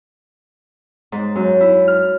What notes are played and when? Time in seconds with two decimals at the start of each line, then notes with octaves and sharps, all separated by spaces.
1.12 G#2
1.35 F#2
1.61 E4
1.88 F6